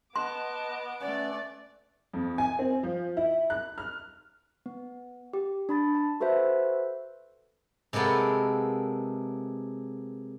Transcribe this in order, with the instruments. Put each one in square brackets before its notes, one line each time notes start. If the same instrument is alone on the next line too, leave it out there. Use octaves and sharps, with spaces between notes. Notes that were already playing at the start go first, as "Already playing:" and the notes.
[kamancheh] B3 D6 [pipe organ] D#5 A5 F#6 [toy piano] C6
[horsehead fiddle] A3 D5 [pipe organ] C#4 B4
[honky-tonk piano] F2
G#5
C4
F3
E4
F#6
F6
[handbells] B3
G4
D4 B5 A6
A5
F#4 A4 B4 C5 E5
[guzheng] C3 G#3 A#3 B3 A4